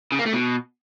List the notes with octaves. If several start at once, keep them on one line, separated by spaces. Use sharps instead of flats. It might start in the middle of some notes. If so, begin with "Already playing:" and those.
C#3
A#3
A3
B2